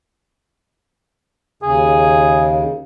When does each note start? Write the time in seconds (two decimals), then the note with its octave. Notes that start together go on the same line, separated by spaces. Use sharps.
1.63 D#2 C#3 G#4